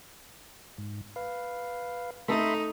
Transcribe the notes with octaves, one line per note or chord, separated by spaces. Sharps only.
G#2
B4 F5
A3 D#4 A4 E5 B5 C6